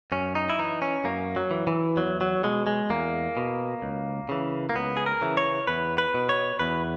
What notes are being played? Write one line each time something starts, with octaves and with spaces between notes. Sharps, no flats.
F#2 C#4
D#4
E4
E3 D#4
C#4
F#2 A#3
F#3
E3
E3
E2 F#3
F#3
B2 G#3
G#3
E2 A#3
B2
C#2
C#3 E3
A#3
C#2 B3
G#4
A#4
C#3 E3
C#5
E2 B4
B4
B2
C#5
E2 B4